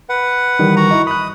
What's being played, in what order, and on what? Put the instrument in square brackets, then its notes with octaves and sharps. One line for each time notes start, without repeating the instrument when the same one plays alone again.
[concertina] B4 F#5
[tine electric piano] D#3 E3 G3
[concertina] F#4 F#5 A#5
[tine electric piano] E4 D#5
[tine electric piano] B5 F#6 [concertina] D#6